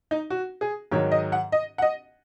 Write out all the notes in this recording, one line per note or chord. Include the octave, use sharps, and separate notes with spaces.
D#4
F#4
G#4
G#2 D#3 F#3 C#5
D#5
F#5
D#5
F#5
D#5